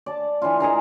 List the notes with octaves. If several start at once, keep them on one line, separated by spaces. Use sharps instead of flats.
D5 A5
E3 D4 F4
D#4 G#4 A#4 A#5